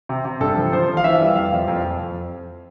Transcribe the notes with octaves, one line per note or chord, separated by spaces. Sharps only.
C3
C3
G2 A4
F3
F3 C5
F3
F5
E3 E5
G3
F2 F5
F2
F2
F2
F2